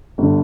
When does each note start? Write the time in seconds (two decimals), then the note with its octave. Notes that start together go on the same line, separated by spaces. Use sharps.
0.18 G1 D3